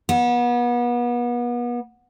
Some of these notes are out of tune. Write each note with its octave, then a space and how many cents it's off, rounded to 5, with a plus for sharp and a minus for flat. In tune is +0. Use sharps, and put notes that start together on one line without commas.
B3 -35